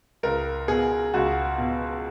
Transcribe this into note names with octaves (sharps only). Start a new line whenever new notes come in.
C#2 A#4
B2 G#4
C#2 F#4
B2